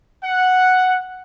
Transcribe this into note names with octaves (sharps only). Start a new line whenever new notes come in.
F#5